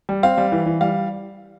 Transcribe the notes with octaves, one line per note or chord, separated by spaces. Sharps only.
G3
C4 F5
G3
E3
E3
G3 F5